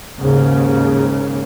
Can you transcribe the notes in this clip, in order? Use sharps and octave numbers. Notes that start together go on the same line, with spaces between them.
D#2 G#2 C#3